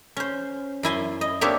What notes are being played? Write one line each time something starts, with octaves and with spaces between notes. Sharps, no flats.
C#4 C5
F#2 E4 G#5 C6
D#5
A#3 C4 D4 G4 C#5 E5